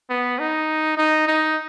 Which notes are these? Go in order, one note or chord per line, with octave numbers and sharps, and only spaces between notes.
B3
D#4
D#4
D#4